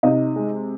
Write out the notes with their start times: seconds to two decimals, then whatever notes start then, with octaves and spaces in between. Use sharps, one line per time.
0.03 C3 D#4 D#5
0.36 G#3